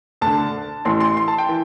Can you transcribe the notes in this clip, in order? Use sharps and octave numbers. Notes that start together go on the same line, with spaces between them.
D2 D3 A5
A1 A2 E3 C6
C6
C6
A5
G5
E3